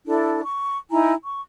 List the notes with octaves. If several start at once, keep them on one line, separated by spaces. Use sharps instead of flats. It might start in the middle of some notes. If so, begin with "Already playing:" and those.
D4 E4 A4
C#6
D#4 E4 G#5 A#5
C#6